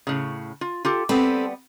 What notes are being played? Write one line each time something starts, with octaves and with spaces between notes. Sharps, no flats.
A2 C#3
F4
F4 G4 A4
G3 B3 C4 A4 B4